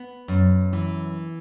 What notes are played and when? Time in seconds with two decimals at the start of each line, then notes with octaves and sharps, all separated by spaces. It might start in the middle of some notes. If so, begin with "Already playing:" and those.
Already playing: B3
0.28 F#2
0.73 E3